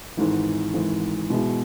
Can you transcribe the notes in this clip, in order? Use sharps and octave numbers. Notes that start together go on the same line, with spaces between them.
G#1 G#2 E3
G#1 G#2 E3
B2 G#3 B3 E4